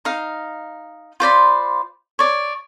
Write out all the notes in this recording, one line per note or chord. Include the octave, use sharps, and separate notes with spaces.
D#4 F5
F4 C5 D5 B5
C#5 D5